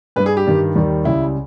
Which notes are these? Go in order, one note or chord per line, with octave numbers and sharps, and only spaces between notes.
G2 G3 B4
G#4
G4
G2 D#3 G3
D#2 D#3 G3
C#2 C#3 G3 E4